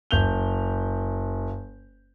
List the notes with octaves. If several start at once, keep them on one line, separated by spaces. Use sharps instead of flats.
F#1 G6 F7 G7